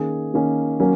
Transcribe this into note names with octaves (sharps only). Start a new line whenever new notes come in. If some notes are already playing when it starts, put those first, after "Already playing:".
Already playing: D#3 A#3 C#4 G#4
D#3 A#3 C#4
F#3 A#3 C#4